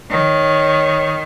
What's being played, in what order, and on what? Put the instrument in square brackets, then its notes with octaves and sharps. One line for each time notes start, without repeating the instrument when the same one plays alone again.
[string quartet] D#3 [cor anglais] C#5